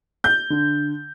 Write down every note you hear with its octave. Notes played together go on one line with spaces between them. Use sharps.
G6
D3